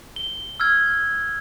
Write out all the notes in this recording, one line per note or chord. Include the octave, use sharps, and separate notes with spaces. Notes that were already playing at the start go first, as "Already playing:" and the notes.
G7
E6 F6 G#6